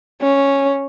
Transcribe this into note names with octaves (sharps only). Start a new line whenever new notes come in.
C#4